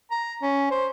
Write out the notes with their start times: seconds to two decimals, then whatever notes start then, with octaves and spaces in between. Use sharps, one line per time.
0.11 A#5
0.42 C#4
0.71 C5